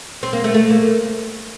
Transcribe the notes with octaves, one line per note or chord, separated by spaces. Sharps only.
C4
A#3
A3
A3
A#3